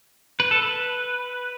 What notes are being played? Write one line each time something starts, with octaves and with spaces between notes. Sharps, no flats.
B4
A4
B4